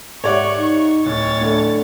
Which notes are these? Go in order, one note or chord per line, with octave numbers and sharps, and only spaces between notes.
G#2 G4 C#5 D5 E5 F#5 C#6
D#4
D1 C#5 A6
D3 A3 E4 A4